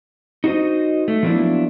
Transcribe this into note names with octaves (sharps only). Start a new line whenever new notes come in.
D#4 F#4 G#4 C5 D#5
A3
F3 F#3 A#3 B3 D4 E4